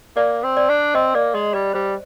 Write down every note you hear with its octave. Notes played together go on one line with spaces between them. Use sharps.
A#3 D5
C4
D5
D4
C4 D#5
A#3 D5
G#3 D#5
G3 D5
G3 C5